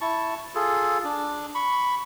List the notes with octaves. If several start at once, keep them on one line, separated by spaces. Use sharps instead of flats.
E4 A5 C#6
F4 G#4 A4
D4
B5 C#6